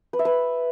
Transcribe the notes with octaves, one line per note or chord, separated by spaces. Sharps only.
B4
E5
B4